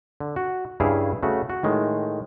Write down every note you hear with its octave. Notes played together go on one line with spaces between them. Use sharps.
D3
F#4
G2 C#3 E4 G#4 F5
C#3 A3 F#4
F#4
A2 D#3 G#3